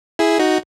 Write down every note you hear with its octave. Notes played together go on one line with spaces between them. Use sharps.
E4 G#4
D#4 F#4